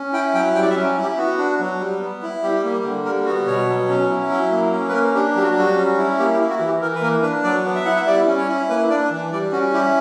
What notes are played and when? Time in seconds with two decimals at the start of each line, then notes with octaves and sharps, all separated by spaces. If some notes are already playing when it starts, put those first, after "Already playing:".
Already playing: C#4
0.13 E4 G5
0.34 F#3 G5
0.54 G3 G5
0.62 D5
0.70 E5
0.76 C#4
0.97 E4
1.02 G4
1.17 B3 F#4
1.38 D4
1.60 F#3
1.80 G3
2.00 B3
2.22 E4
2.43 G3 G4
2.64 A#3
2.85 D3
3.05 G3 A#4
3.26 B3 F#4
3.47 B2 C#5
3.68 F#3
3.89 C#4
4.10 E4
4.30 F#3
4.51 A#3
4.72 C#4
4.89 B4
4.93 A#3 A#4
5.14 D4 G4
5.35 F#3 G4
5.42 F#4
5.56 G3 F#4
5.76 C#4
5.98 E4
6.18 A#3 G4
6.34 G4
6.40 E4
6.50 F#4
6.60 E3
6.66 G4
6.82 E3 A#4
6.95 B4
7.01 A#3 A#4
7.22 D4 B4
7.44 F#3 D5
7.65 B3
7.75 E5
7.85 E4 F#5
7.96 E5
8.06 G3 D5
8.27 C#4
8.38 C#5
8.49 E4
8.69 A#3 B4
8.90 D4 D5
9.11 E3
9.32 G3 D5
9.52 C#4 F#4
9.73 E4 G4